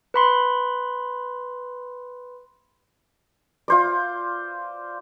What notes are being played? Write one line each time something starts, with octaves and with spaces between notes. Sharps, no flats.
B4 B5 C6
F4 C5 D5